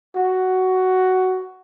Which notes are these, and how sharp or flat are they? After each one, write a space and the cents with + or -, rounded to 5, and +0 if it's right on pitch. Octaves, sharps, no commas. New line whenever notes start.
F#4 +10